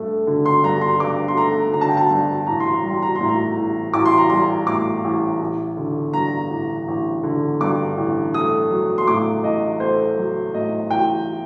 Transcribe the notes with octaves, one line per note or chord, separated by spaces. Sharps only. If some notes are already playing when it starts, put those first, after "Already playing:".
Already playing: G2 A3
D3
C6
G2 A#5
C6
G2 D6
C6
A3 A#5
D3 A#5
A5
G5
A5
G2
A1 A#5
C6
A#5
G3 C6
A#5
A2 C6
A#5
A1
A1 D6
C6
A#5
G3 C6
A2 D6
A1
A1
D3
G2 A#5
A1
A1
D3
G2 D6
A1
A3 D#6
F#3
C6
A2 D6
A1 D#5
A3 C5
F#3
A2 D#5
A1 G5